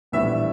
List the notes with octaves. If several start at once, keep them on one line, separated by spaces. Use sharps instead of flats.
A#1 A2 E3 G3 B3 E5